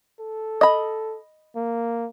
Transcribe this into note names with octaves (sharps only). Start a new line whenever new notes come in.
A4
D#5 B5
A#3